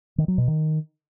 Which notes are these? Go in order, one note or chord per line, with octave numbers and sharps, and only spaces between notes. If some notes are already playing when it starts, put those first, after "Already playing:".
D#3
F#3
B2
D#3